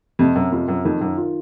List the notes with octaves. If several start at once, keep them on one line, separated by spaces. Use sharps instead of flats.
F2 C3
F#2
F2 F4
F#2
F2 D#3
F#2
F4